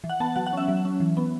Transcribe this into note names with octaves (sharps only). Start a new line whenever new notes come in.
E3
F#5
B3 A5
F#3 F#5
F#5
C#4 E5
F#3
C#4
E3
B3